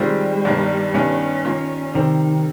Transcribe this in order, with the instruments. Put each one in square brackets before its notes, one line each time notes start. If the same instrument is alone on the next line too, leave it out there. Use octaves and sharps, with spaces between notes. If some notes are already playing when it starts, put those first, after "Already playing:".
Already playing: [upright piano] D#3 G#3 C4 F4 [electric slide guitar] G3
[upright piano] G1 G2 D#3 A#3
[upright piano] G1 G2 D#3 [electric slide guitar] C#4
[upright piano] D#3 A#3 F4
[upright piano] C3 G3 C4 [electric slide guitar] D#3